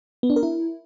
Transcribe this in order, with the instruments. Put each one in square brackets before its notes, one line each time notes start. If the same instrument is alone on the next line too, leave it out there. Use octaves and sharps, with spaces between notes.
[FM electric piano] B3
D4
A#4
E4